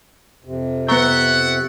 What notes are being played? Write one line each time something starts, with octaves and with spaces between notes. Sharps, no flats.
F2 C3
B3 E5 F#5 A#5 C#6 E6 A6